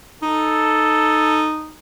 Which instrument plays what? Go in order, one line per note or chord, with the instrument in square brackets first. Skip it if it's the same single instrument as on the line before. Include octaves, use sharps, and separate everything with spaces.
[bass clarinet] D#4 [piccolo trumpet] A4